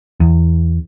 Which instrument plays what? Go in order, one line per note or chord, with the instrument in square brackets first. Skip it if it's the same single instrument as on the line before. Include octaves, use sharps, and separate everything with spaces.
[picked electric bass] E2